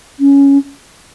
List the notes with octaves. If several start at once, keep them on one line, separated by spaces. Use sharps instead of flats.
C#4